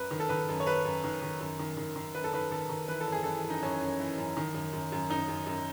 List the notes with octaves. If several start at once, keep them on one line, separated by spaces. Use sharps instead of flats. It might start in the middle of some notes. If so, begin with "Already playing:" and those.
Already playing: F#2 B4
D#3
A4
D#3 B4
F#2
C#5
F#2 B4
F#2
D#3
D#3
F#2
D#3
D#3
D#3
F#2 B4
A4
D#3 B4
D#3 A4
D#3
E3 B4
A4
F#2 G#4
E3 A4
F#2
D#4
F#2 C#4
F#2
E3
F#2
D#3
F#2
F#2
F#2
F#2 D#4
F#2
F#2